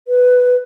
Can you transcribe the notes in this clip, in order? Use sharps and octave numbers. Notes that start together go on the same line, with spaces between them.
B4